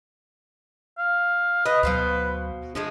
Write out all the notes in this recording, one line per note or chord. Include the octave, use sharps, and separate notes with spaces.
F5
B4 D#5
D2 B2 F#3 C5 F5
F3 G#3 A3 D4